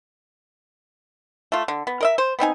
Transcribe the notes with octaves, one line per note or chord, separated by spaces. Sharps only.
A3 F4
D3
B3
A#4 D#5 E5
C5
B3 C4 D#4 G#5